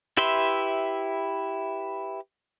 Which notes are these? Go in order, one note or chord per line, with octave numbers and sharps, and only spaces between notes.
E4 G4 B4 E5 C6